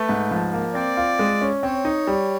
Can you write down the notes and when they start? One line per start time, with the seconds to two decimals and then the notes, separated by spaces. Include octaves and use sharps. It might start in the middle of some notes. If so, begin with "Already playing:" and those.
Already playing: A3 B4
0.09 G#2
0.31 F3
0.53 A#3
0.74 C4 D5
0.97 F4
1.19 G#3
1.42 C#4
1.63 C4 C#5
1.85 D#4
2.07 G3